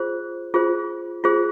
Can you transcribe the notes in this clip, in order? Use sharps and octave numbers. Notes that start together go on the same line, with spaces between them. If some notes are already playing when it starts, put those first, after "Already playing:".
Already playing: F4 G#4 C5
F4 G#4 C5
F4 G#4 C5